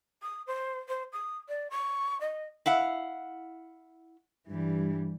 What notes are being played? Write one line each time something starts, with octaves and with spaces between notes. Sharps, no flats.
D#6
C5
C5
D#6
D5
C#6
D#5
E4 F5 F#5
G2 E3 G3